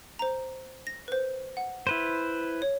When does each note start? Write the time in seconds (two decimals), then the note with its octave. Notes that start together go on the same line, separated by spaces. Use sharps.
0.19 C5 A#5
0.87 A#6
1.08 B4 C5
1.57 F#5
1.87 E4 B4 C5
2.62 C#5